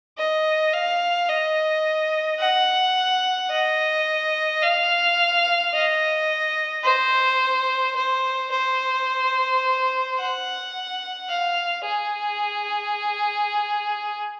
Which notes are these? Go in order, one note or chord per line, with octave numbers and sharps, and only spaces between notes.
D#5
F5
D#5
F#5
D#5
F5
D#5
C5
C5
C5
F#5
F5
G#4